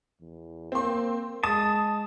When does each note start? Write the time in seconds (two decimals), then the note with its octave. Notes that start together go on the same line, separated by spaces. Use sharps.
0.21 E2
0.72 A#3 C4 C6
1.44 G#3 A5 D#6